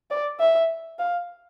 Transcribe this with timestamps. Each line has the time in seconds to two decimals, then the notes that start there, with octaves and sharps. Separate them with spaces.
0.11 D5
0.40 E5
0.99 F5